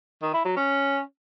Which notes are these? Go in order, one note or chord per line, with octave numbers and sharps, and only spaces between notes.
D#3
E4
F#3
C#4